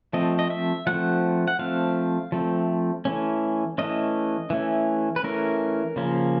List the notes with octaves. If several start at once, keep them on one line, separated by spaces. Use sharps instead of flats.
F3 A3 C4 D#5
D#5
E5
F3 A3 C4 F#5
F#5
F3 A3 C4 F5
F3 A3 C4
E3 A3 C#4
E3 A3 C#4 D#5
E3 A3 C#4
B4
E3 A3 C#4 A#4
C#3 F3 A#3 C#4